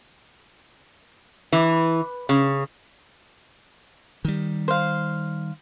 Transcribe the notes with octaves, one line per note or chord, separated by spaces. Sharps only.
E3
C#3
D#3 G3
C5 F5